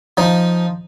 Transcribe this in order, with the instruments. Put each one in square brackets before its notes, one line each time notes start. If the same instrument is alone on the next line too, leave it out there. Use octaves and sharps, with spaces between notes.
[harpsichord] F3 D#4